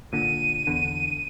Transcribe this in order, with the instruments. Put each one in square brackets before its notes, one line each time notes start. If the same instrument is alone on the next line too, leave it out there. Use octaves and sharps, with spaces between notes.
[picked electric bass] A#2 D3 [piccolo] D#7
[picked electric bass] E2 D3